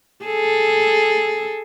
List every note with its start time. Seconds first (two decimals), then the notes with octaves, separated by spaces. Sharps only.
0.25 G#4 A4